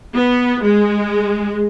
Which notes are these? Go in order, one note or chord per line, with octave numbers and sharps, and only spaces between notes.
B3
G#3